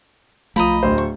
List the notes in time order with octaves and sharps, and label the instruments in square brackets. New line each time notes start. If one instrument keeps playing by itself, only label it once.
[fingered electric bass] B1 A3 [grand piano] F3 [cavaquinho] D#5 A#5 B5
[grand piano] D1 C5
[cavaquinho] C#6